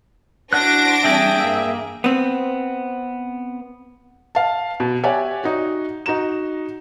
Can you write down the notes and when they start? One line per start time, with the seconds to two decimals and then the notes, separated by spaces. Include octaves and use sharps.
0.53 D4 E4 F#4 C5 F#5 F#6 A#6 D7
1.05 E3 G3 C4 G#4 E5 G5
1.38 G2 A#3
2.04 B3 C4
4.35 F5 A5
4.80 B2
5.03 G4 C#5 D5 E5 F#5 G#5
5.44 D#4 F#4
6.06 D#4 F#4 A#5 E7